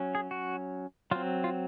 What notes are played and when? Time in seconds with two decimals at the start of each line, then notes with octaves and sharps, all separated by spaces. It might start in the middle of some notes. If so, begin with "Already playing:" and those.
Already playing: F#3 C#4
0.15 G#4
0.31 F#4
1.11 F#3 C4 F4
1.44 F4